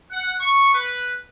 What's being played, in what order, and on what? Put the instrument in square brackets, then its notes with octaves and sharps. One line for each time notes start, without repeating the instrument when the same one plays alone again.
[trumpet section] F#5
C#6
B4